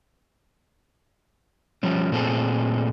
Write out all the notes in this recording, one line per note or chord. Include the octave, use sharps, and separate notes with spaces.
F3 G3 C#4
A#2 A3 C4 G#4 A4